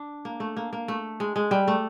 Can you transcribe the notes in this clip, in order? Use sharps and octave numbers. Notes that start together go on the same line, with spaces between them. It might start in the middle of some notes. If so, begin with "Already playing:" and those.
Already playing: D4
A#3
A3
A#3
A#3
A3
G#3
G#3
G3
A3